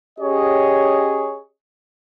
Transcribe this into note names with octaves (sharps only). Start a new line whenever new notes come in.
C#4 G4 G#4 C#5 D#5